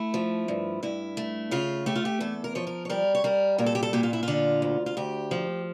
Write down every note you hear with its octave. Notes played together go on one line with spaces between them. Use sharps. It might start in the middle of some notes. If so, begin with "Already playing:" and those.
Already playing: A3 E4
F3
G2
G2 E4
A3
C#3 F4
A3 G4
F4
G4
E2 A4
A#4
F3 C#5
A#4
C#5
G3 A#4
C#5
G3 A#4
A#2 A#4
A4
G4
A4
A#2 G4
F4
E4
D3 F4
D2
F4
D2 G4
F3